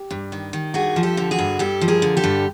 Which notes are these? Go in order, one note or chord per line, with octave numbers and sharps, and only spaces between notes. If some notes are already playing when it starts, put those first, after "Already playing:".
Already playing: G4
G2
D#3
D#3
G2 F#4 G#4
F3
G4 A4
D3
F#4 G#4
G2
G2 G4 A4
F3
G#4 A#4
D3
G4 A4
G2